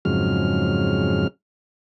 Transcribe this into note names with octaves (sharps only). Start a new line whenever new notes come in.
F2 G#2 C#3 F#3 F6